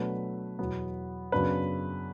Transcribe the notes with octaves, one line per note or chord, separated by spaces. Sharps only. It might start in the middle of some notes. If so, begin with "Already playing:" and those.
Already playing: B2 F#3 A3 D4 B4
E2 B2 F#3 B3
F#2 C#3 F#3 B3 D4 B4